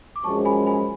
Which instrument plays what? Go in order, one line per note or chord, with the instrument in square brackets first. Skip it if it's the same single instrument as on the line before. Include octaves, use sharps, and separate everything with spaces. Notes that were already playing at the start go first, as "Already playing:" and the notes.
[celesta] D6
[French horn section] F#2 F3 G#3 C#4 G#4 [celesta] A5 C#6
[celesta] G#5 B5
G#5 B5